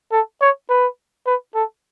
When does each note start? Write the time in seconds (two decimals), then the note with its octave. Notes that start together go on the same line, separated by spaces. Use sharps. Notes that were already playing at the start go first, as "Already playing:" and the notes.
0.12 A4
0.41 C#5
0.69 B4
1.26 B4
1.55 A4